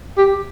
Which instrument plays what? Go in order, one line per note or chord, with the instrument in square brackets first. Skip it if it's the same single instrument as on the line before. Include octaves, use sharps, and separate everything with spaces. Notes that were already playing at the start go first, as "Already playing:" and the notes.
[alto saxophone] G4